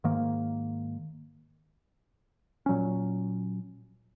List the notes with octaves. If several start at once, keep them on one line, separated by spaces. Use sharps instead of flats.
G#2 D#3 A#3
A#2 F#3 C#4